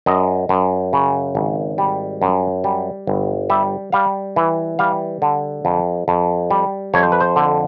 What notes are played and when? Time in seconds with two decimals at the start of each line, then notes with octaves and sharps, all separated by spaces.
0.06 F#2 D#5
0.49 F#2
0.93 C#3
1.35 G#1
1.78 G3
2.22 F#2
2.64 G3
3.07 G1
3.50 G3 E5
3.92 G3 F5
4.36 E3
4.79 G3 F5
5.22 D3
5.65 F2
6.08 F2
6.51 G3
6.94 F2 C#5
7.03 C5
7.12 B4
7.20 C5
7.36 D3